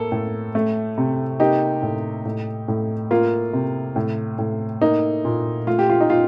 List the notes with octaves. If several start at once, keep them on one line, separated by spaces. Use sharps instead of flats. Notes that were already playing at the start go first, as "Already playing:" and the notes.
Already playing: A2 A#3 A4
A2
A3
C3
A#3 D#4 G4
A2
A2
A2
A#3 F4
C3
A2
A2
A#3 D#4
A#2
A3 F4
G4
F4
D#4
A#2 F4